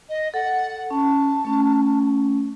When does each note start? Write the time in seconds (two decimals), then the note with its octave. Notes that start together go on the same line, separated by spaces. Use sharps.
0.09 D#5
0.34 A4 F#5
0.91 C#4 A5
1.45 A3 C#4